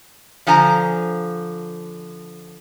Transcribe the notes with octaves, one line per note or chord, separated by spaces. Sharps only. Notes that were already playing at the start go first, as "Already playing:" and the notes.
D3 F3 C5 G#5 A#5